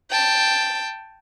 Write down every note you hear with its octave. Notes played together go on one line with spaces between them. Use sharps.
G5 A5